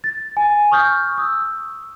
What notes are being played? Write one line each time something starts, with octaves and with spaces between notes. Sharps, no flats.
A6
G#5
C#6 D#6 F6 G6
D#6 E6